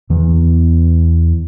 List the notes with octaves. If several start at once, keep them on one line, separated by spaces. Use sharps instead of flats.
E2 E3 B3